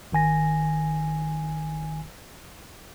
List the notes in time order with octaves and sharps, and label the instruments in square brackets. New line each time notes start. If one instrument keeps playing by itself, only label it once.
[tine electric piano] G#1 D#3 G#5 A#6